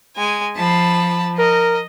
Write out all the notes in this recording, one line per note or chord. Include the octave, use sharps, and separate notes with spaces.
G#3 G#5
F3 A5 B5
A#4 D#5